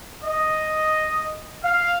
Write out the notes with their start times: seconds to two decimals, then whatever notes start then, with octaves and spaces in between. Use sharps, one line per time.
0.25 D#5
1.64 F5